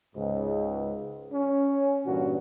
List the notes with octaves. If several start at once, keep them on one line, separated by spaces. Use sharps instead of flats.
C#2 G#2
C#4
G2 A#2 E3 C#4 F#4